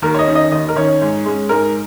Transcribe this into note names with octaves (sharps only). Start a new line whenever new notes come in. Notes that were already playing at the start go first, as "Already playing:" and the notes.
D#2 A#4
C#5
D#5
D#3 C#4
D#5
D#2 D#5
A#4
D#3 C#4 C#5
G#2
G#3 C#4
G#2 A#4